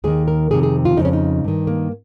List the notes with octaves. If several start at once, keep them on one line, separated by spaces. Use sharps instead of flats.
D#2 D#3 G#4
A#4
F2 C3 D#3 G#4
G#4
F4
F2 C#3 D#4
C#4
D#4
G2 D#3
A#3